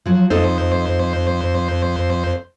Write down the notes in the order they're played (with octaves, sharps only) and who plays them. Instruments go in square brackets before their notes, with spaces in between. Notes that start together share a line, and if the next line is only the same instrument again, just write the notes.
[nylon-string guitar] F3 F#3
[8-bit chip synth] F2 C5 [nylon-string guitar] D#4 A4 D#5